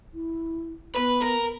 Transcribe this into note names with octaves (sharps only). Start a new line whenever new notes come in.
E4
B3 B4
A#4